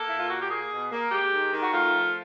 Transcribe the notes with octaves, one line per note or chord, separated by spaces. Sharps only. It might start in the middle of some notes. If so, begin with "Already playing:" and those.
Already playing: A#3 A4
A#2 E4
F4
A#3 F#4
G4
A#3 G#4
B2
A#3
G#3 G4
D#3
D#3
F#4
A3 F4
F3